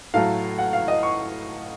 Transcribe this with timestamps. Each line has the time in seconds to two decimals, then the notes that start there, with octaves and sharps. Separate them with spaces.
0.14 A2 F#3 A3 F5
0.58 F#5
0.73 F5
0.88 D#5
1.03 C#6